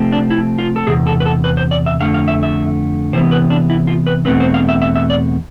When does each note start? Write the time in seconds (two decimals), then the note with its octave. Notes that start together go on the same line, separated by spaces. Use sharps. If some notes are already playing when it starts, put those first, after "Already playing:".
Already playing: C3 F3 A3 C4
0.12 D4
0.30 E4
0.58 F4
0.76 A4
0.87 E2 C3 G#4
1.07 A4
1.20 B4
1.25 A4
1.44 B4
1.57 C5
1.71 D5
1.86 E5
2.00 F2 D3 A3 F5
2.14 F5
2.28 E5
2.43 E5
3.13 C3 E3 B3 C5
3.31 B4
3.50 D4
3.70 E4
3.87 F4
4.07 B4
4.25 E2 B2 A3 C4 B4
4.40 C5
4.54 F5
4.68 E5
4.82 E5
4.95 E5
5.10 D5